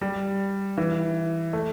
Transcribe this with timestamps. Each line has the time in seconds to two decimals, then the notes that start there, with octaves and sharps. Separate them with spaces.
0.01 G3
0.78 E3
1.53 A3